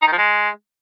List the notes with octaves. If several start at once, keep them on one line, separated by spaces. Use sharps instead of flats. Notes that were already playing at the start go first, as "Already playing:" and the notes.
D#4
D#3
F3
G#3